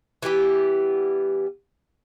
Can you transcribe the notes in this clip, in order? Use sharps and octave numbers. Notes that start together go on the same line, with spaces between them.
E3 G3 B3 G4